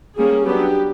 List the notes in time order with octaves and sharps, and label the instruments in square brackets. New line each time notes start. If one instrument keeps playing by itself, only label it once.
[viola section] G3 A#3 C#4 G#4
F#3 B3 D4 G4